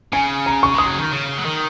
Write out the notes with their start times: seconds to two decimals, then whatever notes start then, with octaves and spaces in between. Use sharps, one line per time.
0.13 C#3 G#5
0.46 A#5
0.63 C#6
0.74 G#3 D#6
0.87 F#3
0.99 D#3
1.12 C#3
1.38 F#3
1.45 D#3